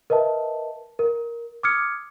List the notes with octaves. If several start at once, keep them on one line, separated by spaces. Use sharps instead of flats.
A#4 B4 D#5 E5 A5
A#4
D6 D#6 F6 G#6 C#7